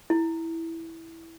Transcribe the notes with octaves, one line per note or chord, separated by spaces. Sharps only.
E4